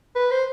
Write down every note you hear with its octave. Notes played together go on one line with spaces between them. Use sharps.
B4
C5